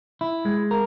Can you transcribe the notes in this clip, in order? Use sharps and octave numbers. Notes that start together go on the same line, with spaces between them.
E4
G#3
A#4